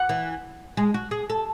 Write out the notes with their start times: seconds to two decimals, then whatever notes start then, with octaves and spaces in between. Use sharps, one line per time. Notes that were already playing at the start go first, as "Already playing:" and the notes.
Already playing: F#5
0.09 E3
0.77 G#3
0.94 F#4
1.11 G#4
1.30 A4